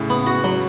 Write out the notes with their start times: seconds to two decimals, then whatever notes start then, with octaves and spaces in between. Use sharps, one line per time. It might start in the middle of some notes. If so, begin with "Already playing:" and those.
Already playing: A2 C#3
0.10 B3
0.27 F#4
0.44 F#3